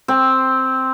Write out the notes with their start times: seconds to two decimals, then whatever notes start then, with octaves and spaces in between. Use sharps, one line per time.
0.08 C4